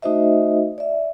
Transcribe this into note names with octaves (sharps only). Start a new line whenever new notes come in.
A3 D#4 F#4 C5 D#5 E5
D5 E5